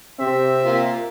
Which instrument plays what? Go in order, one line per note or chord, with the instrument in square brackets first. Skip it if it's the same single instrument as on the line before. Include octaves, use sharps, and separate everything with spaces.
[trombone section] C3 C4 G4 [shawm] E5
[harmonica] A#3 F4